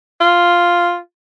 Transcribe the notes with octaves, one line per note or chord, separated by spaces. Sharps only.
F4